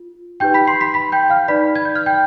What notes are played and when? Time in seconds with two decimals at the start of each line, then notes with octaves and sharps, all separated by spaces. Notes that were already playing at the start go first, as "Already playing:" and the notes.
Already playing: F4
0.40 D#4 G4 B4 G5 G6
0.54 B5 B6
0.67 C6 C7
0.81 B5 B6
0.94 B5 B6
1.12 G5 G6
1.30 F5 F6
1.48 D#4 B4 D5 B5 B6
1.76 G#6
1.85 G6
1.95 F6
2.06 G5 G6